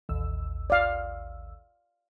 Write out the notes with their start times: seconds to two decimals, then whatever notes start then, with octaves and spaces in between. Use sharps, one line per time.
0.09 A1 D#2 E6
0.70 D5 F5